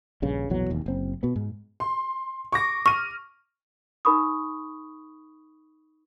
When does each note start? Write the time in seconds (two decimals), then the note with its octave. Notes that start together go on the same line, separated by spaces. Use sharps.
0.22 A#1 G2 C#3
0.50 A#1 E2 B2 F#3
0.70 E1 D#2
0.86 F#1 C4
1.23 B2 B3
1.36 G#2
1.80 C6
2.52 C#6 D6 A#6
2.86 C#6 F6 D#7
4.05 D#4 A#4 B5 C#6 D#6